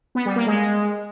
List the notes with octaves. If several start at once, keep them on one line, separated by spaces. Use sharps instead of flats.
B3
G3
A#3
G#3